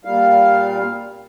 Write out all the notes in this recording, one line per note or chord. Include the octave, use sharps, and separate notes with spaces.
A#2 G3 F5